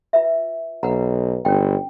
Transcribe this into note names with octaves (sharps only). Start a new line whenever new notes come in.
F4 B4 E5
B1 B4 F#5 A#5
G1 C#4 G5